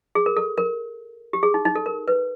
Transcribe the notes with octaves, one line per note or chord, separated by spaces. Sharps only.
G#4
A#4
A4
A#4
G4
G#4
D#4
D#4
A4
A#4
B4